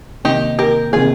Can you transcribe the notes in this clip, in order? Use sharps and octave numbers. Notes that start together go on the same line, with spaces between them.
C3 D#3 A#3 D#4 G4
G4 A#4
C3 D#3 A#3 F4 G#4